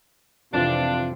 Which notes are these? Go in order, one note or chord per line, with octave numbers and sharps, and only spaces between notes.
F2 C3 E3 F3 D4 F4